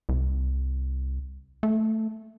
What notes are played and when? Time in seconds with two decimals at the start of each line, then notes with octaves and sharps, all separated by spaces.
0.09 C2
1.63 A3